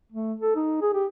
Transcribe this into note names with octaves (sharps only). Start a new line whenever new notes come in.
A3
A4
D#4
G#4
G4